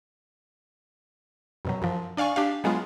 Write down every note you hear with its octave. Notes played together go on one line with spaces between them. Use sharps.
F#2 B2 F#3
F#2 F3
D4 D5 F5 G#5 C#6
D4 G4 F5
F#3 G#3 B3 F4